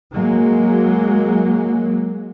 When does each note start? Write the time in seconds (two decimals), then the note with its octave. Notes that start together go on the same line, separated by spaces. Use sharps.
0.11 F#3 G#3 A#3